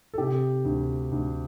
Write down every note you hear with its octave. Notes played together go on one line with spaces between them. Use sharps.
A4
C3 G4
D2
D2